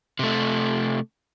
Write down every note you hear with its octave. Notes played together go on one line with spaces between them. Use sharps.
C3 A3